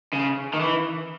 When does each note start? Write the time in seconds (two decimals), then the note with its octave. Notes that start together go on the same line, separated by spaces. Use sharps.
0.13 C#3
0.54 D#3
0.60 E3